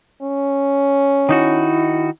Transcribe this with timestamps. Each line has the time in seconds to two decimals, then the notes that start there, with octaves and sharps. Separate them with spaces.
0.22 C#4
1.29 D#3 D#4 E4 F#4